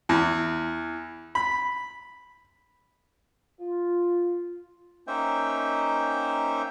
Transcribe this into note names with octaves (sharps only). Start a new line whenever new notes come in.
E2
B5
F4
A#3 C#4 D#4 C5 E5 G5